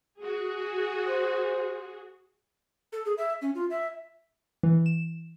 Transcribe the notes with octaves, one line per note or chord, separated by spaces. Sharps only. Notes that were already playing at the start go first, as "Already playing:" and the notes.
F#4 G#4
C5
A4
G#4
E5
C#4
F4
E5
E3
E7